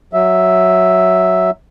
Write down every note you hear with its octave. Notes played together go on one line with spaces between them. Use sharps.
F#3 E5